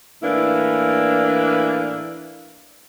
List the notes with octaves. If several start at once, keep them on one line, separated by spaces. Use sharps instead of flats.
A2 E3 A#3 D4 E4